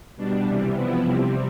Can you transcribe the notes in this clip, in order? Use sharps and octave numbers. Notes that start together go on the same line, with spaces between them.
B2 G3 D4
C3 E3 G3
F3 B3 E4
C3 G3 C4